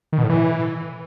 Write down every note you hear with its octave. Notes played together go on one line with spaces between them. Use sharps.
D#3
B2
A2
E3